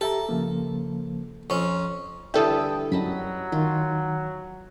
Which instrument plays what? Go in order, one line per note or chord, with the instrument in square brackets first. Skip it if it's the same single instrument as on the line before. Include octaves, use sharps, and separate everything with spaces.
[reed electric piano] G4 E5 A#5 [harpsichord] A4
[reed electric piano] C#3 F3 A#3
[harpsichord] F2 C#4 [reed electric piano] C#6
[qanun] D3 E3 G3 [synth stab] A4 E5 [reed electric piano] G5 A5 D#6
[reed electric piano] F#2 [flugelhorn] F#3 [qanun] D#5 A5 B5
[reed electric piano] D#3 [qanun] F4